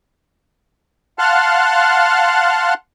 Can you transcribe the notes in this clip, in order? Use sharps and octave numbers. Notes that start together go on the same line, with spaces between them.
F5 F#5 A5 C6 F6 F#6